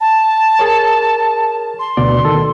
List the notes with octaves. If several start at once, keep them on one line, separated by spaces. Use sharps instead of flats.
A5
G#4 A#4 C#5
C6
D2 B2 D5
D#3 A4